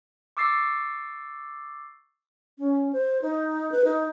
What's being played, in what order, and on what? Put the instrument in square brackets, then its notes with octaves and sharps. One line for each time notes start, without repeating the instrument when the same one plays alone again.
[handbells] C#6 D6 E6 A6 C7
[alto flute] C#4
C5
D#4
B4
D#4